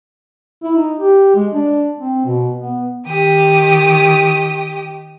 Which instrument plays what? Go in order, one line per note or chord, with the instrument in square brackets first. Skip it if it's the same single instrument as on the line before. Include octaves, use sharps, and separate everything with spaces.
[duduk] E4
D#4
G4
G#3
D4
C4
B2
B3
[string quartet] D#3 G4 D#6